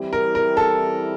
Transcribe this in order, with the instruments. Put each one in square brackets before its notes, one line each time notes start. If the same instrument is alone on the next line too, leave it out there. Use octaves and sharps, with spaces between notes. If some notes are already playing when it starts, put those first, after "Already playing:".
Already playing: [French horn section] E3 G3 C4 E4 G4
[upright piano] A#4
A#4
A4